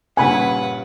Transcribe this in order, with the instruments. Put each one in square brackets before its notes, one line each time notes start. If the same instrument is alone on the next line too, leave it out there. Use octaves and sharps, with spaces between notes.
[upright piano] G2 A#2 C#3 [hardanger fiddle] B4 F#5 [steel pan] G#5 B5